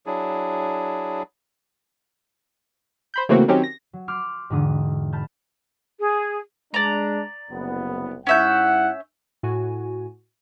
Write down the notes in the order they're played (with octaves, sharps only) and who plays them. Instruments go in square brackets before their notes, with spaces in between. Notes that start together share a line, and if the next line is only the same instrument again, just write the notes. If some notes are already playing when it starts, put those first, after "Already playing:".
[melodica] F#3 D4 E4 G#4
[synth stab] C5 B5 G6
C#3 E3 A3 A#3 C4 F#4
D#3 F#3 C4 C#4 G4
A#6
[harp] F#3
C6 D6 F6 G6
E1 G#2 D3 D#6
A5 B5 F6 G6
[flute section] G#4
[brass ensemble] G#3 D4 [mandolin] D5 A#5
[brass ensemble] F#1 C2 B3
[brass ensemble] G#2 E4 F#5 [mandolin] C#4 E5 G6
[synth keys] A2 F#4 G#5